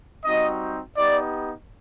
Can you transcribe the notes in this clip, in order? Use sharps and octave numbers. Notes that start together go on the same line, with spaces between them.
G3 C4 D#4 F#4 D#5
B3 D#4 G4 D5